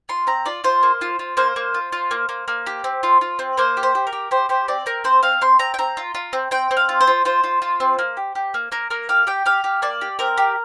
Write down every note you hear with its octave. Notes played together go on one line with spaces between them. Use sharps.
F4 C6
C4 A#5
F4 D5
F4 C5
A#3
F4
F4
A#3 C5
A#3
F4
F4
A#3
A#3
A#3
G4
C4
F4
F4
C4
A#3 C5
G4
C5
G4
A#4
G4
G4 C5
G4 C5
C4 D5
C4 A#4
C4 C5
C4 F5
C4 C6
C4 A#5
G5
C4 A#5
F4
F4
C4
C4 G5
C4
F5
F4
C5
F4
F4 C5
F4
F4
C4
A#3
G4
G4
A#3
A#3 A#4
A#3 A#4
G4 F5
G4 G5
G4 F5
G4
A#3 D5
G4
C4 A#4
G4